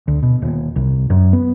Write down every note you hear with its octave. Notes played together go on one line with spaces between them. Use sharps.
D2
B2
D#1
C2
F#2
B3